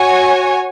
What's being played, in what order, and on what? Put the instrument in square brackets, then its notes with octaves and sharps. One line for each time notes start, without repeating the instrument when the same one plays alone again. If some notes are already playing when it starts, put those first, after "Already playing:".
Already playing: [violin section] F#4 C#5 G#5